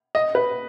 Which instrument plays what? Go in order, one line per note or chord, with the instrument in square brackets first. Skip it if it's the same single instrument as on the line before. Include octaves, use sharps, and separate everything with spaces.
[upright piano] D#5
B4